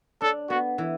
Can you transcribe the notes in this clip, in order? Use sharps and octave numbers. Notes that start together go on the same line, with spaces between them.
D4 A4
B3 F#4
E3